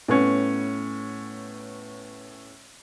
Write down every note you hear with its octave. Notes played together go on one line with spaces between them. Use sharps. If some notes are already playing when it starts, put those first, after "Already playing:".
A2 B3 C#4